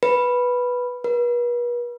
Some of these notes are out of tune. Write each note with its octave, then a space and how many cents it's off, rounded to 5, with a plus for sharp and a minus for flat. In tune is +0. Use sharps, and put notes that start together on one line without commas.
B4 -5
B4 -40